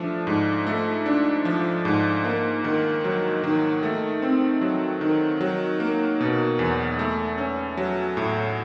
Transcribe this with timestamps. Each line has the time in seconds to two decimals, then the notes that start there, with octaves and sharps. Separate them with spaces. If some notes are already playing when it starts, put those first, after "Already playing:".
Already playing: F3 A3 D4
0.27 G#2
0.67 A3
1.06 D4
1.45 F3
1.85 G#2
2.25 A#3
2.64 D#3
3.04 F#3
3.44 D#3
3.83 A3
4.22 C4
4.61 F#3
5.01 D#3
5.41 F#3
5.80 A#3
6.21 B2
6.59 E2
6.99 A3
7.38 C#4
7.77 F#3
8.17 A2